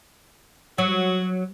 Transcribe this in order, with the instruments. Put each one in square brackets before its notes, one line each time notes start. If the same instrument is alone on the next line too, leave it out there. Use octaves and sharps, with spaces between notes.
[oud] F#3 [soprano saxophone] F#4